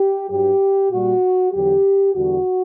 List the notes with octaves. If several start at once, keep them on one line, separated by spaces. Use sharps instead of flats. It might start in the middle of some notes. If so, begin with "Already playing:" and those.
Already playing: G4
G2 F#3 G4
A#2 G3 F#4
E2 D3 F#3 G4
E2 D3 G3 F#4